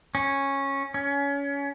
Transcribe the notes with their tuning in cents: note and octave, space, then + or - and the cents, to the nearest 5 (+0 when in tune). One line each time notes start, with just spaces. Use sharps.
C#4 -10
C#4 +25